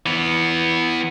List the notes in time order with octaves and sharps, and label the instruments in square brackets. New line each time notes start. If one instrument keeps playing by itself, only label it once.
[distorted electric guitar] E3 B3